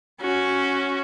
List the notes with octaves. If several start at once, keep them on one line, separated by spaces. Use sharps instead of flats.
C#4 F#4